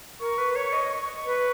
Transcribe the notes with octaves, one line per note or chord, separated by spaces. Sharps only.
A#4 C#6
B4
C#5 C#6
D#5
C#6
B4